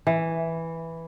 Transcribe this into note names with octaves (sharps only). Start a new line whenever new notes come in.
E3